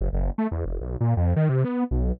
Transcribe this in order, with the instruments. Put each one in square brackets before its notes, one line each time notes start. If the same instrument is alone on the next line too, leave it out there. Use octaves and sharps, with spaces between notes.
[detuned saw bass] F#1
F#1
A3
E2
F1
B1
A#2
F2
D#3
C3
B3
B1